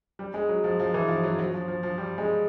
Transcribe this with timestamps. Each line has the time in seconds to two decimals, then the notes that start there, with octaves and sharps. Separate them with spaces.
0.19 G3
0.34 G#3
0.49 F#3
0.64 F3
0.80 F3
0.94 E3
1.08 F3
1.23 F#3
1.39 F#3
1.54 F3
1.68 F3
1.83 F3
1.98 G3
2.18 G#3